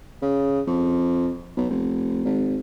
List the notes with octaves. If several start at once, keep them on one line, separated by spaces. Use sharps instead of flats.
C#3
F2
B1
F1
G#1